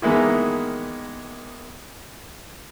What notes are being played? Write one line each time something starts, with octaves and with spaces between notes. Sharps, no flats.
D#3 E3 G#3 A#3 B3